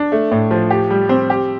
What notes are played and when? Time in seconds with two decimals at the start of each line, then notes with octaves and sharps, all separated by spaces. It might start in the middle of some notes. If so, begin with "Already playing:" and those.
Already playing: D4
0.12 A3
0.32 A2
0.51 F3
0.71 G4
0.90 G3
1.09 C4
1.30 G4